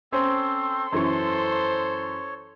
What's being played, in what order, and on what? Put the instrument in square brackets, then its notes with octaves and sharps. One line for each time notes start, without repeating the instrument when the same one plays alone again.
[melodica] C4 A4 [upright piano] C#4 C5 [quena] C6
[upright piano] F#2 E3 C#6 [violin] A4 C5 [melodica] C#5